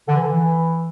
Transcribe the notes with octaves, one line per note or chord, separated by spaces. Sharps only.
D3
E3
D3
E3